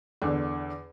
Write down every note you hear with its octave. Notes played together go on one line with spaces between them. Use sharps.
E2 D3